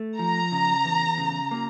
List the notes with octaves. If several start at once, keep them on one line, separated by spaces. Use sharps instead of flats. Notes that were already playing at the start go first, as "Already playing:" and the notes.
Already playing: A3
F3 A#5
C#3
E2
C#3
A#3